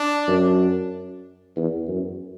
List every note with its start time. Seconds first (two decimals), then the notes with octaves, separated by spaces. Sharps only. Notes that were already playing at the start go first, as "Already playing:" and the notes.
Already playing: D4
0.28 F#2
1.57 E2
1.88 F#2